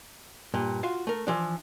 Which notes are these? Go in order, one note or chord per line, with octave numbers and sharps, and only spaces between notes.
G2 A#2
F4 F#4 F5
A3 A#4
E3 F3 D4